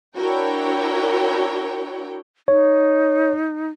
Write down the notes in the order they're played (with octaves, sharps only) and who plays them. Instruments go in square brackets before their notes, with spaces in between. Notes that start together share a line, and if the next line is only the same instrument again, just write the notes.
[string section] D4 E4 F#4 A#4 C#5 G5
[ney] D#4 [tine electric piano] C#5